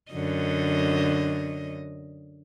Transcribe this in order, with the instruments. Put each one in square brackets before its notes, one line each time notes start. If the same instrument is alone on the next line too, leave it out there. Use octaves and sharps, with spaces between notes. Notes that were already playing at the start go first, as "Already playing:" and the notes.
[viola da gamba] F#2 D3 D#5